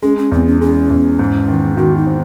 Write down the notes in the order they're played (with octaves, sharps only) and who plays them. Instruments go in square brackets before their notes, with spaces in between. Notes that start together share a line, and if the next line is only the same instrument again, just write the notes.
[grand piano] G#3 [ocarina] C#4
[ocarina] C#4
[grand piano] E2 [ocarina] C4
[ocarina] C#4
[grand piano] G#3 [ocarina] C#4
[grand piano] E2
G#2
D#3
[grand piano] D#3 [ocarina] F#4
[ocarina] D#4
[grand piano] C4